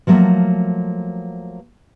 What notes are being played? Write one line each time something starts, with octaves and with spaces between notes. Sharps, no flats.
F3 F#3 A3 A#3